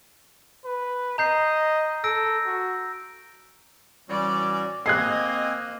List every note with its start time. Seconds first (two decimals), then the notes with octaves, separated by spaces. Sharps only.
0.65 B4
1.18 D#5 A#5 G6 C7
2.04 A4 E6 A#6 D7
2.46 F#4
4.09 A2 E3 G3 C#4 F#4 C#5 D5
4.86 A#3 C4 D#5 G#5 F#6 G#6 C7